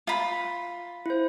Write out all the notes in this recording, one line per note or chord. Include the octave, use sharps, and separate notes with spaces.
F4 B5
E4 C5